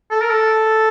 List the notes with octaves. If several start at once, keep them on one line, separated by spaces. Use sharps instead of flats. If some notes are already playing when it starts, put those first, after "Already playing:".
A4
A#4
A4